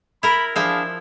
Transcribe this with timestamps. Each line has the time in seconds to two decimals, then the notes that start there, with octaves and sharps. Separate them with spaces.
0.23 E4 A#4 B5
0.56 F3 D4 E4 G#4 E5 F5